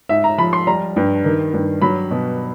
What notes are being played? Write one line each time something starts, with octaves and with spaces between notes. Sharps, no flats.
G#2 E5
A#5
F3 B5
C6
G3 A#5
G2
D#3
G2
F#3 B5
B2